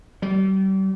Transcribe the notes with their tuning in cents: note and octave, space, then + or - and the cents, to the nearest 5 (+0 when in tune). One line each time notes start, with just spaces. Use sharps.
G3 -35